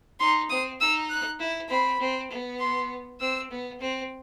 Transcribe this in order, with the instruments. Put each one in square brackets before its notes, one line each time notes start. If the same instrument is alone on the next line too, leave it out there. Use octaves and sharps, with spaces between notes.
[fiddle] D#4 [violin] C6
[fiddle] C4 [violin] D#6
[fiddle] D#4 [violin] E6
[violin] F#6
[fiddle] E4
[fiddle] C4 [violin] B5
[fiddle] C4
B3
[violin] C6
[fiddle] C4 [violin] E6
[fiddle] B3
C4